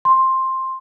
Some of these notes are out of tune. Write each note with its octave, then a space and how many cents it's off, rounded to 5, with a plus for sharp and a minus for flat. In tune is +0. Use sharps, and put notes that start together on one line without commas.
C6 +10